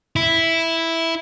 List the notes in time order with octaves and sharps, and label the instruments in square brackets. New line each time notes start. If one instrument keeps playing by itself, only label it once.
[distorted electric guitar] E4